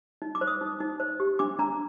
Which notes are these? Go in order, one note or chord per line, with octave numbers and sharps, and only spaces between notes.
D#4
D6
C5
D#6
D#4
D#4
C5
G4
D4 D6
D4 A#5